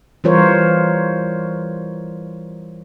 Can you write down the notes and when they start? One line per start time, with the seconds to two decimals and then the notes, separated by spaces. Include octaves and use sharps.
0.24 E3 G3 F4 A#4 C5 C#5